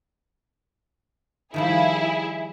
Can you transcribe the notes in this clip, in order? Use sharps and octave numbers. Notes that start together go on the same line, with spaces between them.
D#3 F3 G3 E4 G#4